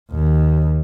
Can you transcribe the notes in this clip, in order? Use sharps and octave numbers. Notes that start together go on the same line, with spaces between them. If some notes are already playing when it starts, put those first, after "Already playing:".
D#2